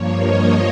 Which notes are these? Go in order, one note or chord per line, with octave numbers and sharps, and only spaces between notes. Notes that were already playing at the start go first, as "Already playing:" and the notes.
Already playing: G2 F3 A#3 C#5
D#5